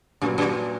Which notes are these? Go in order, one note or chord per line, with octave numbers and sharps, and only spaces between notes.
F#2 A#2 F#3 B3
F#2